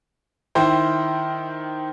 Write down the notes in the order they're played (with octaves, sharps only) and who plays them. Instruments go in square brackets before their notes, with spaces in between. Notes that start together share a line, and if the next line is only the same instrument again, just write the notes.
[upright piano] D#3 E4 C5 G5